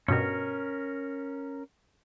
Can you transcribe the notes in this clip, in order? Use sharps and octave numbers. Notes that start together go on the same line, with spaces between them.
G2 B2 C#4 A#4